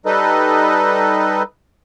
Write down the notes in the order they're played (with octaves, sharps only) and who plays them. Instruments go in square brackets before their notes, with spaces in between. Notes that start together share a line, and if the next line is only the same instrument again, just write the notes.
[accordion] G3 D#4 A4 B4 D#5